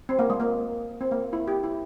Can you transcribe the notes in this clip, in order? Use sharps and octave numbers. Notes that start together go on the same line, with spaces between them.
C4
A#3
G#3
A#3
C4
A#3
E4
G4
E4